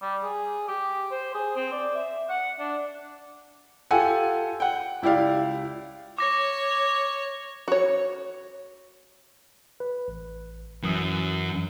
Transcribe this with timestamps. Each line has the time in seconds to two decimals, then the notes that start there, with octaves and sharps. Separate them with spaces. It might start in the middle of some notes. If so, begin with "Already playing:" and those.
0.02 G3
0.23 G#4
0.68 G4
1.11 C5
1.34 G#4
1.56 C4
1.72 D5
1.95 E5
2.29 F#5
2.59 D4
3.91 F4 G4 A4 F#5 G#5
4.60 F#5 G5
5.02 C#2 E4 G4 D5 F5
6.18 C#5 D6 A#6
7.68 F#4 C#5
9.80 B4
10.08 A1
10.83 F#2 E3 D#6 E6